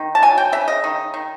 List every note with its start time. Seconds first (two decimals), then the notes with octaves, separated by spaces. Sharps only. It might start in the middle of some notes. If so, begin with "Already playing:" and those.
Already playing: D#3
0.15 A5
0.22 F#3 G#5
0.38 G5
0.52 C#3 E5
0.68 D#5
0.84 D#3
1.14 D#3